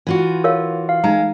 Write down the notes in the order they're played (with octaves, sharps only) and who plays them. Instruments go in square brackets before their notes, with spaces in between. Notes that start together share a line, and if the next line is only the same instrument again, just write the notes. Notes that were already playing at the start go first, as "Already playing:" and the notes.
[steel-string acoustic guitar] E3 F4 F#4
[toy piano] A#4 C#5 F5
[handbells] F5
[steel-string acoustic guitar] G#3 [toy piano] D#4 A#5